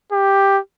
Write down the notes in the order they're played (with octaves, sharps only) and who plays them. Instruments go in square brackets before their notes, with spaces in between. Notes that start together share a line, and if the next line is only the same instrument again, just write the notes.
[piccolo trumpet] G4